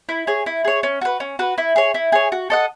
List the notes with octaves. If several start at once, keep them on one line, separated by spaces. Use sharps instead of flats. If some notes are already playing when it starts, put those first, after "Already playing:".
E4
G#4 C#5
E4
G#4 C#5
C#4
F#4 B4
C#4
F#4 B4
E4
G#4 C#5
E4
G#4 C#5
F#4
A4 D#5 F#5